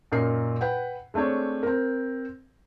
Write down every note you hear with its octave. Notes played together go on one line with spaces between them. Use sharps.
F#2 A#2 D#4 A#4 C7
B4 F#5 G5
G#3 A3 C4 D4 C#5
C4 A#4